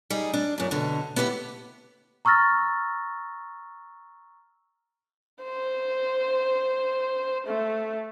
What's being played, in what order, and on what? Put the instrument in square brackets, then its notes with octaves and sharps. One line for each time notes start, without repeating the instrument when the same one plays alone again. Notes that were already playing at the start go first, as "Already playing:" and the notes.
[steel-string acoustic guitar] G3 D#4 G#4
D4
F#2 A#2
B2 D3
B3 E4 G4 G#4 B4
[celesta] A#5 C#6 E6 F6 A6 A#6
[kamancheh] C5
A3